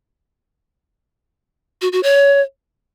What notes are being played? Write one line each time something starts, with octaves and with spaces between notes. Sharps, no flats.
F#4
F#4
C#5